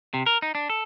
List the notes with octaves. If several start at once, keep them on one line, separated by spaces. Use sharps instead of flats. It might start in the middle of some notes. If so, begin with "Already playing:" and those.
C3
A#4
D#4
D4
A4